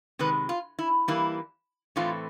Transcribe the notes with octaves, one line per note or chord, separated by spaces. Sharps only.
C3 D#3 G#3 C4 B4
F4
E4
E3 G3 A#3 E4
A2 E3 A3 C4 F4